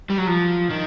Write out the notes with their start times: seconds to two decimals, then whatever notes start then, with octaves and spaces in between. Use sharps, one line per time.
0.10 G3
0.18 F#3
0.27 F3
0.70 D#3